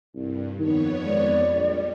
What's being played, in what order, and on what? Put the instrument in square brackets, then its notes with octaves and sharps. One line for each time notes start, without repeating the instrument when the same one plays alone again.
[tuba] C2 [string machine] G2
[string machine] F2 B3 C#5 [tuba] D#3
[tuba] G#3 [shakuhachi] D5
[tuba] A#1 [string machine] G3